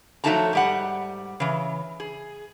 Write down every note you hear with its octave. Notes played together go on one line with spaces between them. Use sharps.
F3 F#3 A3 D#4 A5 A#5
G#2 G3 F#5
C#3 E3
G#4